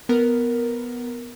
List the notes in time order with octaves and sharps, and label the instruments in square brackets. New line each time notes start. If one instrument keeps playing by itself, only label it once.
[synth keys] B3 A#4